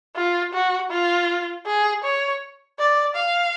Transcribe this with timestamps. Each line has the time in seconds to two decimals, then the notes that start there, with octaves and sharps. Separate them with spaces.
0.16 F4
0.54 F#4
0.91 F4
1.67 G#4
2.04 C#5
2.79 D5
3.16 F5